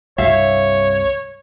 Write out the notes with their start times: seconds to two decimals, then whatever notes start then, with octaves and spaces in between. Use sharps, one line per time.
0.18 C2 G2 C#5 E5 F5